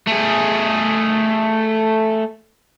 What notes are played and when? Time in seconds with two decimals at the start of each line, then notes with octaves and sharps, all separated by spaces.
0.08 A3 G#4